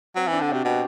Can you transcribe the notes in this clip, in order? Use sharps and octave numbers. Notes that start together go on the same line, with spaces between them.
F#3 C4
E3 D4
D3
C3 F#4
B2 G4